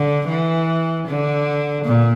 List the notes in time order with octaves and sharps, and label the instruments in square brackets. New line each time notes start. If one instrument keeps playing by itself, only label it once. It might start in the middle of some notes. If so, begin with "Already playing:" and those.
Already playing: [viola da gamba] D3
E3
D3
A#2